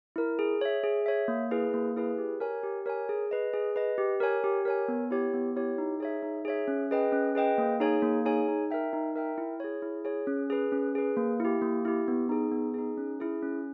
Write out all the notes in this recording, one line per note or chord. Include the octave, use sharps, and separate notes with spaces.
E4 A#4
G#4
C#5 E5
G#4
C#5 E5
A#3
E4 G#4 B4
A#3
E4 G#4 B4
G4
A#4 C#5 G#5
G4
A#4 C#5 G#5
G#4
B4 D#5
G#4
B4 D#5
G4
A#4 C#5 G#5
G4
A#4 C#5 G#5
B3
E4 G4 C#5
B3
E4 G4 C#5
D#4
G#4 C#5 E5
D#4
G#4 C#5 E5
C#4
G#4 B4 D#5 G5
C#4
G#4 B4 D#5 G5
A#3
D#4 G#4 C#5 G#5
A#3
D#4 G#4 C#5 G#5
D#4
A#4 E5 G5
D#4
A#4 E5 G5
E4
G#4 C#5
E4
G#4 C#5
C#4
G#4 B4
C#4
G#4 B4
A#3
E4 G4
A#3
E4 G4
B3
D#4 G#4
B3
D#4 G#4
C#4
E4 G#4
C#4